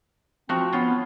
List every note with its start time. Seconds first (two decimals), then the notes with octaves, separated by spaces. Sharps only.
0.49 F3 C4 F#4
0.73 B3 C#4 F4